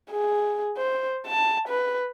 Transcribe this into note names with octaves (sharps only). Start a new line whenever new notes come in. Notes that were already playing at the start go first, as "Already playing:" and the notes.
G#4
C5
A5
B4